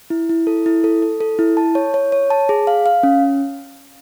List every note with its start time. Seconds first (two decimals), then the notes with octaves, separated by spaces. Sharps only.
0.10 E4
0.29 E4
0.47 A4
0.66 E4
0.84 A4
1.02 A4
1.21 A4
1.39 E4
1.57 A5
1.75 C#5
1.94 C#5
2.12 C#5
2.30 A5
2.49 G#4
2.67 F5
2.86 F5
3.03 C#4